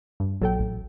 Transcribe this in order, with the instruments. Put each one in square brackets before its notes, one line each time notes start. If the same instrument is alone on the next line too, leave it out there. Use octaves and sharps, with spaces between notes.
[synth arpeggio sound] G2
[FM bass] A#1 [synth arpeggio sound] F#3 A4 G5
[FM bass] A1